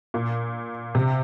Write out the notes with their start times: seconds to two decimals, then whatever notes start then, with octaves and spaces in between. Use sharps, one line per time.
0.14 A#2
0.95 C3